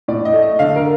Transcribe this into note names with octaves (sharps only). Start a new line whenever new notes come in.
A2 D5
D#5
A3
D#5
D3 F5
A#4